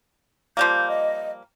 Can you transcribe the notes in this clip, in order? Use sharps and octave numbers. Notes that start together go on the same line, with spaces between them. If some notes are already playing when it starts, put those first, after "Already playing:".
F3 G3 A#3 G6
D#5